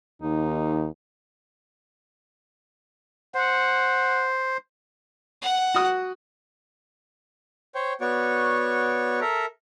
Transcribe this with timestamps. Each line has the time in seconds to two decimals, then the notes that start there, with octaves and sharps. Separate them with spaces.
0.22 D#2 D#4
3.35 C5 F#5
5.42 F#5
5.74 F#4 D#6
7.75 C5 C#5 G5
8.01 B3 F#4 C#5 D5 C#6
9.21 A4 A#4 E5 A#5